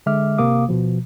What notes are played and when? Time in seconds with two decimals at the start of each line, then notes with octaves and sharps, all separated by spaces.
0.06 D3 G#3 E5 D6 F6
0.38 G#1 C3 A#3 F5 D6 D#6
0.69 B2 F3